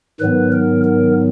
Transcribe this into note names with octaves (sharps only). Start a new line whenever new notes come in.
G#2 D#3 F#3 B3 B4
A#4
A#4